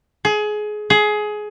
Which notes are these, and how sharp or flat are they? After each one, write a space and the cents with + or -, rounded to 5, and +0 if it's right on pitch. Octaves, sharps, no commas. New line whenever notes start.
G#4 +25
G#4 +20